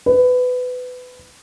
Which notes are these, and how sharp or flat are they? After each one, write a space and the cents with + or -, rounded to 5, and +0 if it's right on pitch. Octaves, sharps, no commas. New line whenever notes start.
B4 +20